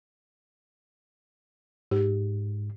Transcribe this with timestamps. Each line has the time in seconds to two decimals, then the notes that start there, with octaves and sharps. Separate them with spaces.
1.91 G#2 G4